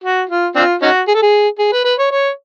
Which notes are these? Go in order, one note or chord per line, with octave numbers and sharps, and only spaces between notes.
F#4
F4
C4 D4 F4
C#4 D#4 F#4
G#4
A4
G#4
G#4
B4
B4
C#5
C#5